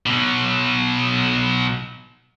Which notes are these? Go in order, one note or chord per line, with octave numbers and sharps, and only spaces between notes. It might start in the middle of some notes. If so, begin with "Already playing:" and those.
B2 F#3